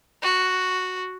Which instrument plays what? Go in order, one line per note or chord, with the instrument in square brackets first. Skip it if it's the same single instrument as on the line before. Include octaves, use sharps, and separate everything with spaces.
[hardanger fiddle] F#4